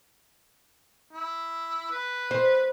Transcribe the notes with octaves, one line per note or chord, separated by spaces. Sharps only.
E4
B4
C5